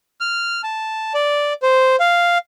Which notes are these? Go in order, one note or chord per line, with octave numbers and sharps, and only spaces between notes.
F6
A5
D5
C5
F5